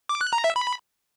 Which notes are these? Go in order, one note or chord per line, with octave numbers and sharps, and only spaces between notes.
D6
F#6
A#5
E5
B5